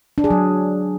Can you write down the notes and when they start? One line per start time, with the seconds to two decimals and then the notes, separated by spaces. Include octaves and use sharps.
0.18 D4
0.24 G#4
0.30 F#3